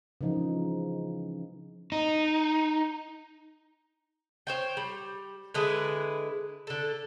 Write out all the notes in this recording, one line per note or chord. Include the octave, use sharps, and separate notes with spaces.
C#3 E3 F3 D#4
D#4
C5 C#5 G5
G3
D3 G#3 E4 B4
D3 A4